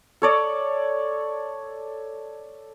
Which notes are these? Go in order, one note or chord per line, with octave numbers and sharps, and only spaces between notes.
A4 C#5 D5